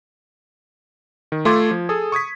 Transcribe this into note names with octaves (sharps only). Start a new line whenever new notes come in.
D#3
A3 F4 A4 C6 D6 G#6
F3
G#4 A4 D#6
C#6 D#6 G#6 B6